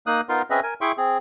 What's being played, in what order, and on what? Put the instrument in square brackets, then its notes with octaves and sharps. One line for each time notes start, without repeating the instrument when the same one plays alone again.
[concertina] A#3 D#4 D#6 F#6
B3 D#4 F4 A#4 C6
C4 C#4 G#4 B4 D#5 E5
A#4 G#5
E4 G#4 E5 G5 C6 C#6
C4 G#4